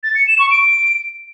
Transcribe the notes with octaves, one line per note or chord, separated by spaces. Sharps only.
A6
C#7
E7
C#6
D7